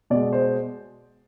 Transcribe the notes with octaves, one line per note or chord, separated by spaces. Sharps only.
B2 G#3 D5
C5